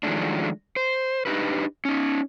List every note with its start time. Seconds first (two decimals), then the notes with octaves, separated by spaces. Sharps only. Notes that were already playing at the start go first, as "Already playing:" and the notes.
0.03 D#3 F3 F#3 G#3 A3 D4
0.76 C5
1.26 D4 D#4 G4 B4
1.85 C#4 D#4